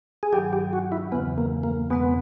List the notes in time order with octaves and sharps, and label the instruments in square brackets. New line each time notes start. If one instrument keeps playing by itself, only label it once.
[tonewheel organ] G#4
[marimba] G2 D#3 F#3 [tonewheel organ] G4
[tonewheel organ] G4
F#4
E4
[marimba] E2 C#3 E3 [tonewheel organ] B3
[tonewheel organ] A#3
A#3
[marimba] E2 B2 G#3 C4 [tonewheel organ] B3